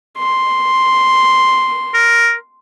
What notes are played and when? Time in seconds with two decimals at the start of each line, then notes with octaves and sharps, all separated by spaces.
0.18 C6
1.94 A#4